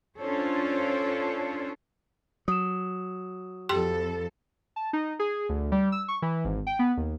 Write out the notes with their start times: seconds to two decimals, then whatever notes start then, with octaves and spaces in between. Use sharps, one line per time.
0.18 C#4 D4 F4 A4 C5 C#5
2.48 F#3 D#6 E7
3.69 F2 G4 A4 G5 C6
4.76 A5
4.93 D#4
5.19 G#4
5.49 D2
5.72 G3
5.92 E6
6.08 C#6
6.22 E3
6.44 G#1
6.67 G5
6.79 B3
6.97 D#2